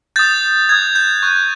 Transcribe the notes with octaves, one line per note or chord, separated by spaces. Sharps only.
D#6 G6 A6
D#6 F#6 G#6
G6
C#6 F#6